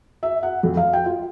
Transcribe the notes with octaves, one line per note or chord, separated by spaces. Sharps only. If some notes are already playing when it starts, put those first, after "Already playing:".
E5
F#5
F2
F5
G5
F4